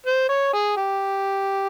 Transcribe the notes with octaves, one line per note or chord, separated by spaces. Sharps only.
C5
C#5
G#4
G4